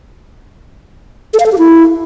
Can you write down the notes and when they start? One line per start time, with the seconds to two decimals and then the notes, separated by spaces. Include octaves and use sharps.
1.34 A4
1.40 F5
1.46 A4
1.52 G4
1.58 E4